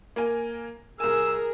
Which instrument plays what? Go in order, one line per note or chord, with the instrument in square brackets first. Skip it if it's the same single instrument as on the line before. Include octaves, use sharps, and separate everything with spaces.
[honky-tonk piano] A#3 A#4 G#5
[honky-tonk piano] C2 G#5 [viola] G#4 A#4 [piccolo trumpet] E6